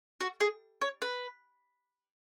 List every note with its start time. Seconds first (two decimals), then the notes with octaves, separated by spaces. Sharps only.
0.21 F#4
0.40 G#4
0.81 C#5
1.02 B4